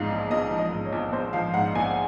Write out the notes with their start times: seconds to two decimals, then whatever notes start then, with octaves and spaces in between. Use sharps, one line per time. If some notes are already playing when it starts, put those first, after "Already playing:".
Already playing: A#1 G#2 F3 F5
0.10 A#1
0.31 A#1 D#5
0.51 F3
0.58 D#5
0.72 G#2
0.85 C#5
0.92 A#1
1.12 A#1 C5
1.33 F3 F5
1.54 G#2 F#5
1.75 A#1 G#5